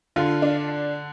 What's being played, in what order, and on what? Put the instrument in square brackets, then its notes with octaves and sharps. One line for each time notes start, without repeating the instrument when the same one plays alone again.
[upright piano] D3 [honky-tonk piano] F4
[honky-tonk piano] D4